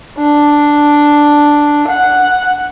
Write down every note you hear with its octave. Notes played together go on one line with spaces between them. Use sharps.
D4
F#5